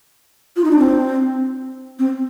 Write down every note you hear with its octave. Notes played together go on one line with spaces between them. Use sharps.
F4
D#4
D4
C4
C4